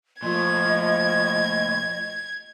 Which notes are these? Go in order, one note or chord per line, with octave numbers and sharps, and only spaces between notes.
A#2 F3 A3 D#5 G#6